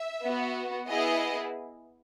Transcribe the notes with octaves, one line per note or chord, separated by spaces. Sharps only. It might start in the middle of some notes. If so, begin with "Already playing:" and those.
Already playing: E5
B3 F#4
B3 E4 G#4 D#5